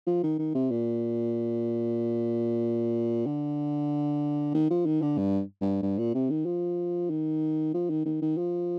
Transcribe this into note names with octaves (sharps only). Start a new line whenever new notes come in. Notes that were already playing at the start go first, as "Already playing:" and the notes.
F3
D#3
D#3
C3
A#2
D3
D#3
F3
D#3
D3
G2
G2
G2
A#2
C3
D#3
F3
D#3
F3
D#3
D#3
D#3
F3